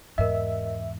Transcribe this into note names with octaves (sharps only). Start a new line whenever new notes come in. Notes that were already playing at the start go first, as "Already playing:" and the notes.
E2 G#2 A#4 D#5 E5